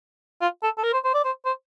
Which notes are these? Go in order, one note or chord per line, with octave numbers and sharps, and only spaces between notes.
F4
A4
A4
A#4
C5
C5
D5
C5
C5